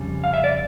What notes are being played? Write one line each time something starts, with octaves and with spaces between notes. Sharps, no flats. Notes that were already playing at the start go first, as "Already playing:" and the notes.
Already playing: F2 C#3 G3
F5
E5
D5